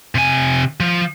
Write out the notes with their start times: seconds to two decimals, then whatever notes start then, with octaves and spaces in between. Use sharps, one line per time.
0.15 C3 G#5
0.80 F3